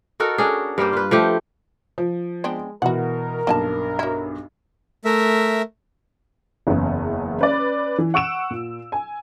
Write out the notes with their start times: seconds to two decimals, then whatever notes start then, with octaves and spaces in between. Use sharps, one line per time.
0.20 D#4 F#4 A4 A#4
0.38 C#4 D4 G#4
0.78 G2 G3 A#3 C5
0.93 F4 B4
1.11 F3 A3 G4
1.98 F3
2.44 G#3 B3 C4 D4
2.82 B2 E3 F#4 A#4 F#5
3.47 B1 G2 A#3 D#5 A5
3.99 F#3 E4
5.05 A3 A#4 E5
6.67 F#1 E2 C#3 B3 C#4
7.38 C#4 B4 D5
7.98 E3
8.14 F#5 C#6 E6 D7 E7
8.51 A#2
8.92 G#5